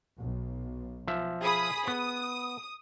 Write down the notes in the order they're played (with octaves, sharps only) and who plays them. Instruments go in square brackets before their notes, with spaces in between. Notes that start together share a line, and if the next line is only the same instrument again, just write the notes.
[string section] B1
[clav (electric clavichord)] F3 E5
[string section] G#4 B5 D#6
[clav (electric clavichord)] B3 [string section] D#6